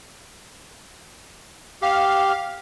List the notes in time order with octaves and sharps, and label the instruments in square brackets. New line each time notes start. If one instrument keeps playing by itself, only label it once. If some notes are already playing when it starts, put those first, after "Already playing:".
[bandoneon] G4 [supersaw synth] F5